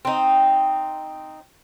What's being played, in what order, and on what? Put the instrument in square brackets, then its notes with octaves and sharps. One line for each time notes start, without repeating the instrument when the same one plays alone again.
[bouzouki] C4 D#4